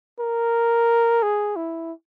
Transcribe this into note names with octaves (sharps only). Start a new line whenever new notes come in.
A#4
G#4
E4